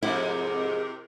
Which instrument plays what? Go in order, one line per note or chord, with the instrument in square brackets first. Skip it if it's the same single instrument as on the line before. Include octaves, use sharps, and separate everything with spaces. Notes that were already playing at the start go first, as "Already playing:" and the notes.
[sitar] F2 G#2 [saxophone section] C3 G4 A#4 [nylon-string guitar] E4